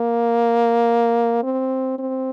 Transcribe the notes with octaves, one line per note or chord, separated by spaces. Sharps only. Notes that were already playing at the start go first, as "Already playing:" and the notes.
Already playing: A#3
C4
C4